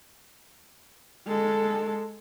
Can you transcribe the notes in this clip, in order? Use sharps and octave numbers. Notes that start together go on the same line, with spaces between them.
G#3 A4